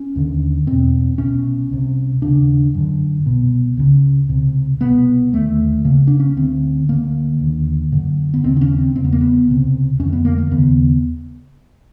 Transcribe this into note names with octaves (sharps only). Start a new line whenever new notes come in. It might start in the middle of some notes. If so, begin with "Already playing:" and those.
Already playing: C#4
D#2 D3
E2 B2 C4
C2 B2 C#4
C2 C3
D#2 C#3 D4
F#2 D3
C2 B2
C#2 C#3
C#2 C3
C2 B2 B3
D#2 D3 A3
C#2 C#3 A#3
D4
C#4
D2 D3 C4
D2 D3 A#3
D#2 D3
F#2 D3
B3
D#2 C#3 C4
D4
C#4
C4
E2 C#3 C4
B3
A#3
B3
C#2 C3
F2 D3 C#4
B3
A#3
A#3
D#2 C#3 B3